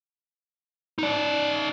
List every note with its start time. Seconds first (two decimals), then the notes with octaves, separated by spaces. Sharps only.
0.99 D#4 D5